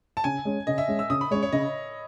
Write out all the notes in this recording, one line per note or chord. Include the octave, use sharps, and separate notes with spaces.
A5
C#3 G#5
G#3 C#4
C#3 D#5
E5
G#3 C#4
E6
C#3 D#6
B5
G#3 C#4 C#5
C#5
C#3 D#5